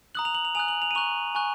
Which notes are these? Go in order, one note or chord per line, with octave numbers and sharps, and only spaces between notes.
A#5 D#6 F#6 F#7
F7
F#7
F7
G#5 D#6 F#6 F7
F#7
F7
D#7
A#5 C#6 F#6 F7
G#5 C#6 F#6